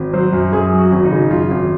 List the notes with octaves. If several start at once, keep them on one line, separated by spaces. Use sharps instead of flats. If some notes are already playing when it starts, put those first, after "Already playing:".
Already playing: G#1
F#3 C5
F#2
F#2 G#4
F#3
F#4
G#1
D#4
C#3
F#2 F4
G#1